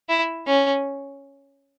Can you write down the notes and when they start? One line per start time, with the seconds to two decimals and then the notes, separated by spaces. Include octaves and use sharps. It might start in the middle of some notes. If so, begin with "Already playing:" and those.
0.09 E4
0.46 C#4